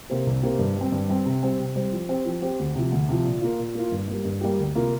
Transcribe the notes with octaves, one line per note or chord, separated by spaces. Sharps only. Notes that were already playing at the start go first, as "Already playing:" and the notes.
C3 A#3 G4 C5
C2
C3 A#3 G4 C5
G2
G3 C4
G2
G3 C4
C3
G3 C4 G4 C5
C3
G3 C4 G4 C5
F3
C4 G4 C5
F3
C4 G4 C5
D2
C3 F3
D2
C3 F3
A#2
A#3 F4
A#2
A#3 F4
G2
G3 A#3 G4
G2
G3 A#3 G4
D2
C3 A#3 F4